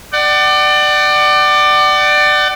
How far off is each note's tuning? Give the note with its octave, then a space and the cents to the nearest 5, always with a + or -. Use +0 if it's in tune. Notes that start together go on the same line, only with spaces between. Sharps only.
D5 +20 F#5 +40